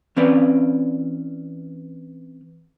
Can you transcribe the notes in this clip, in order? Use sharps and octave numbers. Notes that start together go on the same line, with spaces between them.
E3 C4 C#4 B4 D5